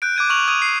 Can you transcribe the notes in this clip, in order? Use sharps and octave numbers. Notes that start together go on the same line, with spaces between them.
F#6 G6 D7
D6 F#6 G#6 D#7
C#6 F6 F7 F#7
D#6 G#6 D#7
C7